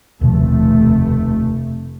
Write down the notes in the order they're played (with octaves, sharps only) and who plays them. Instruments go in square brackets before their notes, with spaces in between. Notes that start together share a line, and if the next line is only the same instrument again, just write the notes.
[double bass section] F1 A3 [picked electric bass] D#2 B2 F3